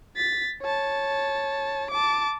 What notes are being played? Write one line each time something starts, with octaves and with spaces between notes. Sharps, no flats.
A6 B6
C#5 A5
A5 D6